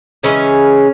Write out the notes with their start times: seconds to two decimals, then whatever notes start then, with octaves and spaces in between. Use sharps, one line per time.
0.23 C#3 E3 G#3 C#4